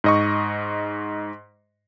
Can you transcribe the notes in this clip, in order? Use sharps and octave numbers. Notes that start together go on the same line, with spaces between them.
G#2 D#5 C#6